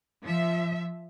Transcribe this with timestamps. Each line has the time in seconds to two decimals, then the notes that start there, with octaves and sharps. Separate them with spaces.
0.22 F3 E5